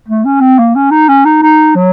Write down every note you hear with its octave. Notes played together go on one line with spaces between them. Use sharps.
A3
C#4
C4
A#3
C#4
D#4
C#4
D#4
D#4
F#3